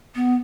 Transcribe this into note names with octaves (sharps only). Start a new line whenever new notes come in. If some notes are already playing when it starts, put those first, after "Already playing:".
B3